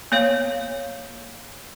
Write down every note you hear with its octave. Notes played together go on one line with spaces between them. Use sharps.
A#3 B3 C#5 F5